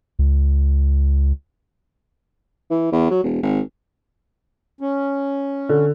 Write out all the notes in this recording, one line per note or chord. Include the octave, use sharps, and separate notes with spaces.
C#2
E3
E2
F#3
E1
G#1
C#4
D3